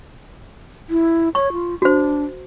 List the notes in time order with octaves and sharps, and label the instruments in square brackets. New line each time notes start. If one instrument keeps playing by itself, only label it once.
[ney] E4
[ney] C#5 [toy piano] C#6
[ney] F4
[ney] D4 [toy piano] F#4 C5